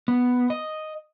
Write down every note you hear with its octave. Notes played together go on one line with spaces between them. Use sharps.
B3
D#5